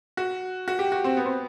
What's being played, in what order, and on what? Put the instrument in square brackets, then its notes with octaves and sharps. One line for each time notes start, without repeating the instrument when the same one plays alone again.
[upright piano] F#4
F#4
G4
F#4
C4
B3
C4